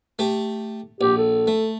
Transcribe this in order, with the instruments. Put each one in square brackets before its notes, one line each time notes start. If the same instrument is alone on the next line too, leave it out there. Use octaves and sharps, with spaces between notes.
[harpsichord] A3 G4
[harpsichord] A#1 [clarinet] G4
[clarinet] A4
[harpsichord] A3